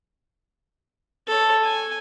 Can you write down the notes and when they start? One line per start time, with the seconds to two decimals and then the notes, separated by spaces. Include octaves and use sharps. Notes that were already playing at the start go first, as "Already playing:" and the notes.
1.27 A4 C#5
1.64 G#5